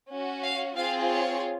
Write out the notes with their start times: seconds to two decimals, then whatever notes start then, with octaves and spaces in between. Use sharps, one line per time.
0.10 C#4 F#4
0.43 F5
0.76 C4 F4 G#4 F5
1.09 C#5